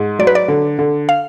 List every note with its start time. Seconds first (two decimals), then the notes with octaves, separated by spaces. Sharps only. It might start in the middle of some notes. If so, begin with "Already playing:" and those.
Already playing: G#2
0.19 F#3 D5
0.27 B4
0.35 D5
0.48 D3
0.79 D3
1.09 F5